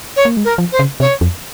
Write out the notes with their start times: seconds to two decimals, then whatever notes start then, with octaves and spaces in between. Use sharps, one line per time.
0.16 C#5
0.25 A#3
0.37 G#3
0.44 A#4
0.58 F3
0.72 C5
0.79 C#3
1.00 C3 C#5
1.21 F2